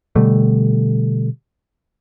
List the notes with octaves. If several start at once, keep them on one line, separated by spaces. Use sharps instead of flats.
B2 D3 G3 A3